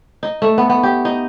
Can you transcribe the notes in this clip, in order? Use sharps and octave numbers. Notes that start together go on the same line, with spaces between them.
D#4
A3
B3
B3
G4
D#4